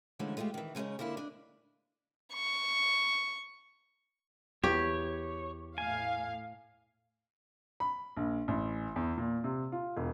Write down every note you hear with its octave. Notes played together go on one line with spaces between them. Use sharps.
D3 E3 F3 G#3 A3 C#4
G#3 A3 E4 F4 G4
D#3 E3
C#3 G#3 A3 C#4 D#4
D3 A#3 B3 E4 F4
D4 D#5
C#6
E2 G4 C#5
A2 F5 G#5
B5
A#1
A1
E2
A#2
C3
F4
E1